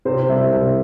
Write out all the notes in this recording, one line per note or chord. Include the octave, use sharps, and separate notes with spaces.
C3 C5
C2 E5
C2